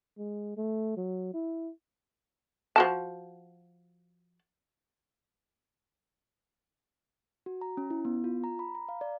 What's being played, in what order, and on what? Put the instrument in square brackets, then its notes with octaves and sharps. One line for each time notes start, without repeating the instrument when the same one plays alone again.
[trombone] G#3
A3
F#3
E4
[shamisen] F3 F#4 A5
[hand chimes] F#4
A#5
C#4
E4
B3
F4
A#5
B5
A#5
F5
D5